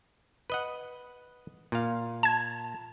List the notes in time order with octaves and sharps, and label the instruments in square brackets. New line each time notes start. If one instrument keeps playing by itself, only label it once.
[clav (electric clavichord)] B4 D#5 F#5
A#2 F5
[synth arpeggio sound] A5 G#6